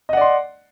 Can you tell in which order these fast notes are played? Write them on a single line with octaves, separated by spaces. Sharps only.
D#5 F#5 D5 C6